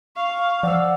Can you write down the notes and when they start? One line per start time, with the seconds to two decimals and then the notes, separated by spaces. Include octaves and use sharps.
0.16 F5 C#6
0.63 F3 D5 F#5 E6